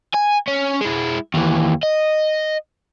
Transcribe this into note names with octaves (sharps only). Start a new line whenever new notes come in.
G#5
C#4
G#3 E4
D#2 E3
D#5